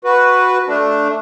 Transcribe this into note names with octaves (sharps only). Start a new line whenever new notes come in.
F#4 B4
A3 D4